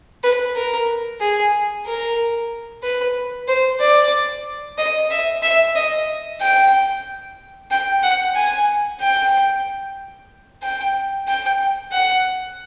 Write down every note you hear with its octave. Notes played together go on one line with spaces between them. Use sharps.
B4
A#4
G#4
A#4
B4
C5
D5
D#5
E5
E5
D#5
G5
G5
F#5
G#5
G5
G5
G5
F#5